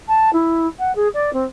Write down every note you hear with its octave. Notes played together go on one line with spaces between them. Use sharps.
A5
E4
F#5
G#4
D5
C4